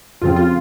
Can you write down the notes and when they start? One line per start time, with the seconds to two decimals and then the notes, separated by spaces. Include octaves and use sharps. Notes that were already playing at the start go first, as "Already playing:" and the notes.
0.22 F2 C#3 F3 C4 F4
0.36 F4